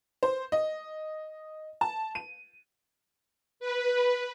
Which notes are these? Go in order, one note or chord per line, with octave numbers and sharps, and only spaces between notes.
C5
D#5
A5
D#7
B4